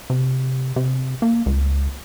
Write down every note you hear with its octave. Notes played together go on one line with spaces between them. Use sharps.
C3
C3
A#3
C#2